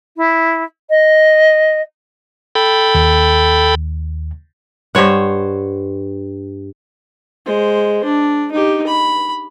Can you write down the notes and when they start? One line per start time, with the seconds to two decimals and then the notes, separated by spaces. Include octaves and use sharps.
0.16 E4
0.89 D#5
2.55 A4 G5 B5
2.95 D#2
4.95 G2 C5 C#5 F#5
7.46 G#3 C5
8.04 D4
8.52 D#4 G4
8.87 B5